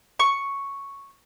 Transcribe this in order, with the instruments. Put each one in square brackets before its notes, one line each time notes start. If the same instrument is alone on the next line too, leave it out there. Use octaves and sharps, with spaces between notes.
[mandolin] C#6